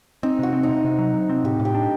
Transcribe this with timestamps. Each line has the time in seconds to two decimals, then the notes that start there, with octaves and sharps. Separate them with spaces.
0.23 C4 D#4
0.39 C3 F#4
0.53 C4
0.63 D#4
0.69 C3
0.84 C3
0.99 F#3
1.14 C3
1.29 C4
1.44 A2 G4
1.60 A2
1.65 G4
1.75 D4